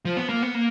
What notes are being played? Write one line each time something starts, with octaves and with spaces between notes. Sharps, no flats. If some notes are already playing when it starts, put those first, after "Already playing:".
F3
B3
A#3
B3
A#3